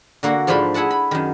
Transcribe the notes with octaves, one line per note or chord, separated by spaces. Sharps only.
D3 A#3 F#4
G#2 F3 A3 D4 F4 B5
E4 G#4 E5 F#5 A5
B5
F#2 D#3